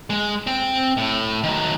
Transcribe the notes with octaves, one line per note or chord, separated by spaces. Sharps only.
G#3
C4 G5
A2
D#3 F#3